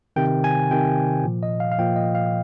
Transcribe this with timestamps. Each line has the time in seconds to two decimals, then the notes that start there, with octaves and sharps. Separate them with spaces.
0.16 C3 D#3 G5
0.44 G#5
0.71 C3 D#3 G5
1.25 A#2 F3
1.43 D#5
1.60 F5
1.72 F5
1.78 A#2 F3 G5
1.96 D#5
2.15 F5